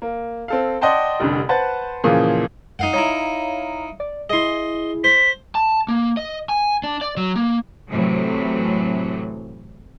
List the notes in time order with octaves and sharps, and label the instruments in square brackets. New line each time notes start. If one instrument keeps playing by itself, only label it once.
[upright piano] A#3
C4 A4 F5
D5 D#5 F#5 G5 A5 C6
F1 C2 F2 D3
B4 C5 F#5 A5 A6
A#2 C#3 E3 F3 A#3 G#4
[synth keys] F#2 [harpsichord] D#4 F5 F#5
[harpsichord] D#4 E4 [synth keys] C#5 F5 A#5
[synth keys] D5
[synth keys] E4 G#4 [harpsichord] D#5 C6
[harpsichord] C5 [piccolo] B6
[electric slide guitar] A5
A#3
D#5
G#5
D4
D5
F#3
A#3
[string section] A2 C3 E3 F#3 A3